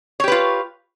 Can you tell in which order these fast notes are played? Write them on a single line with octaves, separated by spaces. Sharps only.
C#5 G4 B4 F4